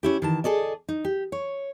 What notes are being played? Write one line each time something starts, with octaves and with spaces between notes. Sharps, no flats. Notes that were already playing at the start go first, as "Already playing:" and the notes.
C#4 E4 G4
D#3 E3 A5
G#4 A4 D5 D#5
D#4
G4
C#5